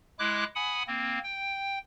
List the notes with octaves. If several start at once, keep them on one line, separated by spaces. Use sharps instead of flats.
G#3 E4 D6 F#6
F#5 G#5 B5 D#6
A#3 C4
G5